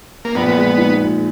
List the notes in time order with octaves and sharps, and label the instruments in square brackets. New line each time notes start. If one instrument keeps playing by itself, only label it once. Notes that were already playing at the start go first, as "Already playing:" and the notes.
[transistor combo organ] A#3
[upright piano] A#1 [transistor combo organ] B3
[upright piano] G#3
D#4
A#2